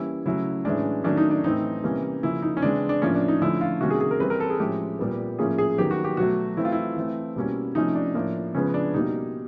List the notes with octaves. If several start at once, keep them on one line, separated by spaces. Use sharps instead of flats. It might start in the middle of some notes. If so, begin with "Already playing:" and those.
Already playing: E3 G3 A#3 C#4 E4
C#3 F#3 A3 C#4 E4
A2 E3 G#3 C#4 D4
D#3 F#3 A3 C#4 D4
D#4
D4
A2 E3 A3 C4 D#4
C3 E3 G3 A#3 C#4
C#3 F3 A#3 C#4 E4
D#4
C#4
C#3 E3 G#3 C4 D4
D4
A2 F3 A#3 C#4
D4
D#4
D3 F3 A3 C#4 E4
F4
C3 D#3 G3 A#3 C#4 F#4
G#4
G#4
A#4
E3 G3 C4 B4
A#4
A4
G#4
A2 F3 G#3 C#4 G4
A#2 G3 B3
A2 F3 A#3 C#4 G#4
G#4
D#3 F#3 B3 G4
F#4
G4
B2 F#3 A3 F#4
E3 A3 C4 E4
F4
E4
E3 A3 C4
B2 G3 A#3 C#4
C3 F3 A3 C#4 D#4
D4
A2 F3 A#3
C#3 F3 G#3 B3 C#4
D4
B2 G3 A#3 D#4